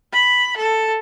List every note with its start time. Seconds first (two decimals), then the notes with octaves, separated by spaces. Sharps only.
0.13 B5
0.57 A4